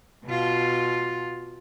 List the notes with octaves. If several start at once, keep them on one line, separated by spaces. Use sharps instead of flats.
B2 F4